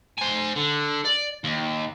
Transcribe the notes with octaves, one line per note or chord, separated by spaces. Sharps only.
C5 G#5
D3
D5
D#2